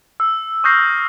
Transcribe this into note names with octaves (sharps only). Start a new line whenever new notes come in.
E6
C#6 D#6 F6 G6 A#6 C7